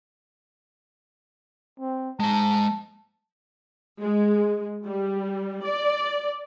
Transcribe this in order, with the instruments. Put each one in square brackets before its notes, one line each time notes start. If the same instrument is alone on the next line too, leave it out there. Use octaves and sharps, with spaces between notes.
[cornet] C4
[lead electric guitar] G#3 A#5 [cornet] A5
[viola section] G#3
G3
D5